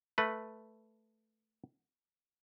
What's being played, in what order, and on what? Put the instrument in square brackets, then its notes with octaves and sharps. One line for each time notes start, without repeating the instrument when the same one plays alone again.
[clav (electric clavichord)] A3 B4